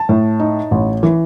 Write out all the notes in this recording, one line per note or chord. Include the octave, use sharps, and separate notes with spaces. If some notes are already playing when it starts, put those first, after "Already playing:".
Already playing: A5
A2
D#4
A1
E3